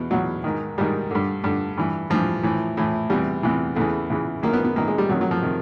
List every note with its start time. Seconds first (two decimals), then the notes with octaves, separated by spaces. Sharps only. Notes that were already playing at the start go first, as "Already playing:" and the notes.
Already playing: E2 B2
0.10 E2 B2 F#3
0.44 G#2 D#3
0.78 G#2 D#3 G3
1.11 G2 D3
1.44 G2 D3
1.78 G2 E3
2.10 G2 E3 F3
2.43 A2 E3
2.77 A2 E3
3.10 E2 C3 E3 G3
3.43 E2 C3 E3
3.76 E2 C#3 E3 A3
4.10 E2 C#3 E3
4.43 F#2 D#3 A#3
4.53 B3
4.64 B3
4.76 F#2 D#3 A#3
4.88 G#3
4.98 G3
5.09 F2 C3 D#3 F#3
5.21 F#3
5.31 F3
5.42 C3 D#3